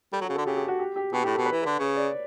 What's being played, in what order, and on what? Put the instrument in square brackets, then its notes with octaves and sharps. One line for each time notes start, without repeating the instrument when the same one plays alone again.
[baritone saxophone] G3 [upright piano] A4
[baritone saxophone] F#3
[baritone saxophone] C#3 [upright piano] F#4
[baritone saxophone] D3 [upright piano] A4
[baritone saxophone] C#3 [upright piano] G4
[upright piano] G4
F#4
G4
G4
[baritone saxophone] B2 [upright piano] G4
[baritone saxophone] A2 [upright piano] G4
[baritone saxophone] B2 [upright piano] A4
[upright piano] B4
[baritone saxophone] E3
[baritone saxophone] D3 [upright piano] B4
[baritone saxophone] C#3 [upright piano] C#5
[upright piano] D5